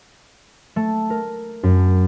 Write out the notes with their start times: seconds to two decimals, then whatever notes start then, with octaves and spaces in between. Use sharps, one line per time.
0.76 A3
1.10 A#4
1.63 F#2